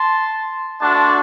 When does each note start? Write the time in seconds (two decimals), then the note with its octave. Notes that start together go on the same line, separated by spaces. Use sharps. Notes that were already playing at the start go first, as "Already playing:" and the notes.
Already playing: A5 C6
0.80 A3 D4 F#4 A5 C6